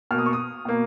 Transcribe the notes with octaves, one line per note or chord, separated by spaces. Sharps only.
B2 A#3 F6
D#6
C#6
D#6
B2 A#3